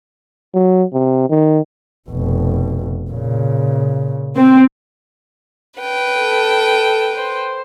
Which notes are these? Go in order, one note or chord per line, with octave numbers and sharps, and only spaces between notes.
F#3
C3
D#3
F1 B2
A#2 C#3
C4
B4 G5
A4
C5